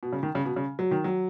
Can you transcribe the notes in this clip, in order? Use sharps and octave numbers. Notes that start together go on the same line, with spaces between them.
B2
C#3
D#3
C#3
B2
C#3
F#3
D#3
F#3